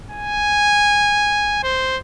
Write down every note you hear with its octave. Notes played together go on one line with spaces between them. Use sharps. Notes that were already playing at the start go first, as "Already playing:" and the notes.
G#5
C5